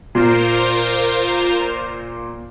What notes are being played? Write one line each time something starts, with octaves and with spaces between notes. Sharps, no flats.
A#2 F4 A#4 C5